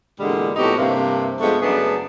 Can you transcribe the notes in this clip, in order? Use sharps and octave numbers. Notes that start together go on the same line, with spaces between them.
E2 A#2 D3 G3 G#3
F2 A2 B3 D#4 F#4 G4
G2 C3 A#3
G2 F3 G#3 A3 B3
F#2 C#3 A3 B3 D4 G#4